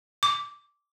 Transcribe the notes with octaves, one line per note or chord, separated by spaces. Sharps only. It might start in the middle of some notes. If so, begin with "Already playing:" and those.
D6